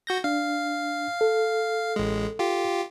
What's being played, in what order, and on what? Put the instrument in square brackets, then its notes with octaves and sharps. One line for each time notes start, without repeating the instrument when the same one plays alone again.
[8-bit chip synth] F#4 G6 A#6
[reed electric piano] D4 [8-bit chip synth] F5
[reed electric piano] A4
[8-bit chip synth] A1 G#3
F4 G4